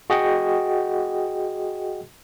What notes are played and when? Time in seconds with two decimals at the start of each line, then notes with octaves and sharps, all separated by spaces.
0.10 F#4 G#4 D#5 F#5 G5